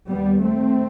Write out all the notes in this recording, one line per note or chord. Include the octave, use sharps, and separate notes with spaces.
D#2 G3 B3
A3 C4